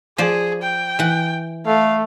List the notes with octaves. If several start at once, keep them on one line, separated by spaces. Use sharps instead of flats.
F3 G#4 C5 D5
G5
E3 F#5
A3 F5